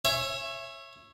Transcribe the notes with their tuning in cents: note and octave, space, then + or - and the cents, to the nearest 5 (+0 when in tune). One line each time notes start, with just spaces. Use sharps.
C#5 -20 E5 +15 G#5 +0